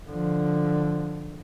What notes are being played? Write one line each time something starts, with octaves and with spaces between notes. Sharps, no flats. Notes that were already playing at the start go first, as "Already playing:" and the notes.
D3 F3